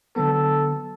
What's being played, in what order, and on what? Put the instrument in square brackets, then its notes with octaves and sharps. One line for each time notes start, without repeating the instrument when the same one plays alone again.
[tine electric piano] D3 F#3 B3 [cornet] A4